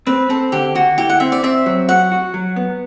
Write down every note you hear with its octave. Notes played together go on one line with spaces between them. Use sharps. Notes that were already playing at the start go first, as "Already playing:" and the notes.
C4 B4
C4 A4
D3 G4
D3 F#4
E4 G4
F#5
C4 E5
D5
C4 E5
F#3
F#4 F#5
F#4
F#3
B3